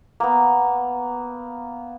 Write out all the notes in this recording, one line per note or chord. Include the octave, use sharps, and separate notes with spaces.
A#3 B3